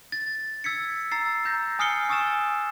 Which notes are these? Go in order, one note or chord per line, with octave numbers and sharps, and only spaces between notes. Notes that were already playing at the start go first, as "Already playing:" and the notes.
A6
E6 G#6 B6 C#7
A#5 E6 A6 C7
A#5 G6 A6 A#6
G#5 D#6 F6 C7 C#7 G7
G#5 C#6 D#6 E6 A6 E7